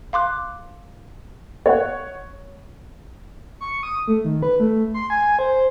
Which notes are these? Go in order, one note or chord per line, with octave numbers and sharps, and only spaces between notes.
F5 C6 D6 F#6
C#5 F#5
C#6
D#6
A3
D#3
B4
A3
C6
G#5
C5